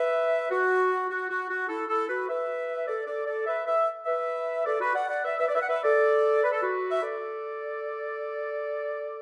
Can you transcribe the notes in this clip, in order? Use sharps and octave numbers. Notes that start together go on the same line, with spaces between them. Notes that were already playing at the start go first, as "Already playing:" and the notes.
Already playing: B4 E5
F#4
F#4
F#4
F#4
E4 A4
E4 A4
F#4 B4
B4 E5
A4 D5
A4 D5
A4 D5
B4 E5
B4 E5
B4 E5
A4 D5
F#4 B4
D5 F#5
D5 F#5
B4 E5
B4 E5
D5
B4 E5
F#5
B4 E5
A4 D5
B4
A4
F#4 B4
E5
A4 D5